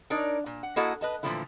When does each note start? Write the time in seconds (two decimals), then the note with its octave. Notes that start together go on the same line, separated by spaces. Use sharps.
0.10 D4 D#4 A#4 C#5 D5
0.46 A#2
0.63 F#5
0.76 A#3 E4 F#4 A4 D#5 F#5
1.01 B4 D#5 A5
1.23 A#2 D3 E3 F3 A3 E4